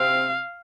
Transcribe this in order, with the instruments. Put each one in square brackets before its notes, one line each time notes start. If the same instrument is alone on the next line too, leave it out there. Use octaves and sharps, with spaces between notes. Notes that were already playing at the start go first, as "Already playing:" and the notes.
Already playing: [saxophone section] C3 C4 [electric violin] F5